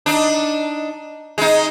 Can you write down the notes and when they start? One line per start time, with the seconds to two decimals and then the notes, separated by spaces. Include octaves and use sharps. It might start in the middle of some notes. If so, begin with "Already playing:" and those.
0.06 D4 D#4
1.38 G#3 D#4